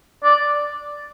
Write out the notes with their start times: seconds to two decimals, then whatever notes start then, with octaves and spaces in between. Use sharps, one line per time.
0.24 D5